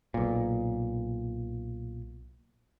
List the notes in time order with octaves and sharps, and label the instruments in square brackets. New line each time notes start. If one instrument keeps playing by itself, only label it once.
[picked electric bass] B1 A#2